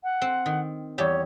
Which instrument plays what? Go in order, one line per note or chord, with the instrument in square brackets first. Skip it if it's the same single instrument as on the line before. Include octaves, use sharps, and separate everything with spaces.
[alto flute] F#5
[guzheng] C4
D#3
[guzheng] E2 G3 G4 [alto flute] C#5